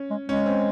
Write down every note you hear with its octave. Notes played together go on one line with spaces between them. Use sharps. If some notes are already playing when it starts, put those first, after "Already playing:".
Already playing: C#4
G#3
G#3 C#4
C4